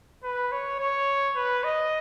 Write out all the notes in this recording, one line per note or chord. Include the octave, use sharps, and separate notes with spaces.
B4
C#5
C#5
B4
D#5